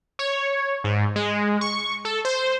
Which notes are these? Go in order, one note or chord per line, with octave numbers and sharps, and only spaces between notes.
C#5
G#2
G#3
C#6
A4
C5